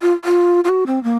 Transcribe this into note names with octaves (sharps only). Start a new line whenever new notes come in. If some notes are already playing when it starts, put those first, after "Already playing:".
F4
F4
F4
F#4
C4
A#3